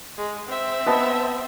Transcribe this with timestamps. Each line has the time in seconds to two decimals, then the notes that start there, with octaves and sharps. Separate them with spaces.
0.17 G#3
0.49 C4 E5
0.86 B3 D#5 A5